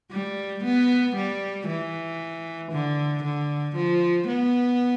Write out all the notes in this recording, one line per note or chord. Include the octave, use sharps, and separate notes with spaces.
G3
B3
G3
E3
D3
D3
F3
B3